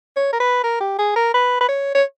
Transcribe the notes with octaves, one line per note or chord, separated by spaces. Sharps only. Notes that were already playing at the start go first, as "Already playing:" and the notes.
C#5
A#4
B4
A#4
G4
G#4
A#4
B4
B4
C#5
C#5